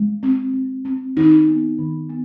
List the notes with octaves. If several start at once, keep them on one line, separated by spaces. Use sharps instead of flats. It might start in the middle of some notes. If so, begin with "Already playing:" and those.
Already playing: G#3
C4
C4
C4
D#3 D#4
B3
D#3
B3